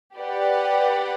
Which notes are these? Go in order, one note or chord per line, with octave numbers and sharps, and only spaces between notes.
G4 B4 D5 F#5